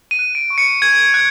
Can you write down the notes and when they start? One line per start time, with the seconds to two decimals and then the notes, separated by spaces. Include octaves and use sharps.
0.11 D#7
0.19 F#6
0.35 D7
0.50 C#6
0.58 C#7
0.82 C#6 G#6
1.14 F#6